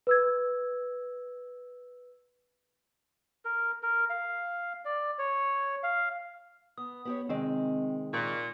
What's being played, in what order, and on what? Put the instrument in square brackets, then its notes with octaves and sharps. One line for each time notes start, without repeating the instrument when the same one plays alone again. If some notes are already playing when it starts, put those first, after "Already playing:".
[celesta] B4 E6 G#6
[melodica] A#4
A#4
F5
D5
C#5
F5
[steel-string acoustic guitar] B3 [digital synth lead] D#6
[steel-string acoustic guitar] B3 G4 C#5
[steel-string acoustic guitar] C3 D#3 G#3 [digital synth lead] C4
[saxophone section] A#2 [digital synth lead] C#6